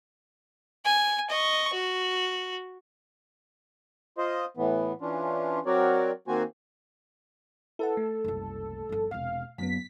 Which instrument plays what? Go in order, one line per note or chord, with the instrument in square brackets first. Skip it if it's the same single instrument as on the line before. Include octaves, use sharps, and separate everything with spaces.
[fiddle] G#5
D#5 C#6
F#4
[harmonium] F4 C5 D#5
A2 E3 B3
E3 C#4 D4 F4
F#3 C4 F#4 A#4 C#5 D5
D#3 A#3 C4 F#4 C5 G#5
[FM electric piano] E4 B4 F#5 [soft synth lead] A4
[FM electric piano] A3
[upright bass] F#1 C2
G1 F2
[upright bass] E1 C3 [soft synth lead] F5
[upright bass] F#1 [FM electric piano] F#2 F#3 B3 [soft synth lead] B6